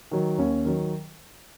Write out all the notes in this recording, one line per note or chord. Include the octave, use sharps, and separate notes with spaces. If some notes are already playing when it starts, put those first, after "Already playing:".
D#3 F#3
D#2 C#4
D#3 F#3